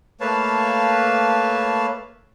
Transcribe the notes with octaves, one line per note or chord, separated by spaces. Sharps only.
A3 A#3 B4 C#5 F5 A5